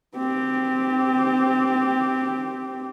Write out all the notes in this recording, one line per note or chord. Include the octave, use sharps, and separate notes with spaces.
C4 G4